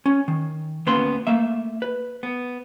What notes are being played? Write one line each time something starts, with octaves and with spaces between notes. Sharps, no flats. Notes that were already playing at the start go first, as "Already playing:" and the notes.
C#4
D#3
D2 A#3 B3 C#4 B4 C6
A3 A#3 E5
B4
B3